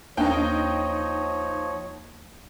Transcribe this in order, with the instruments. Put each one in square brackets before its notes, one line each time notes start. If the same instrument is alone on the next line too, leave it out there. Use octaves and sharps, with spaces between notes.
[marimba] D#2 D4 [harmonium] F3 C#5 [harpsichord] A#3 [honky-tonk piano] D#4 G5